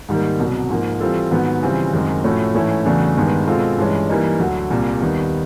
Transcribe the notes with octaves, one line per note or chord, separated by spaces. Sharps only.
G#2 D#3 G3 A#3
C2 B2 F#3
G#2 F3 A#3
E3 G3 C4 F4 A4
G#2 D#3 F#3 B3
C#3 E3 G3 C4 F4
F#2 D#3 G#3 C4
A2 F3 A3 C#4 F#4
G#2 E3 A3 C#4 E4
E2 C#3 F#3 A3 D4
G2 D#3 G#3 B3
B2 G#3 C4 F4 A4
G2 E3 G#3 C#4
E3 G3 A#3 D#4
D2 D3 F#3
C2 A#2 G3
D#2 D#3 G3 B3